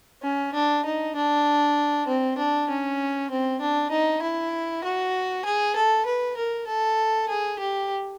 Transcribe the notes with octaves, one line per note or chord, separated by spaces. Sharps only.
C#4
D4
D#4
D4
C4
D4
C#4
C4
D4
D#4
E4
F#4
G#4
A4
B4
A#4
A4
G#4
G4